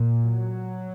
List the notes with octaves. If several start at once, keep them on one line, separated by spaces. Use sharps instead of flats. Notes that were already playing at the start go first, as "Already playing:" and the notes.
Already playing: A#2
F#3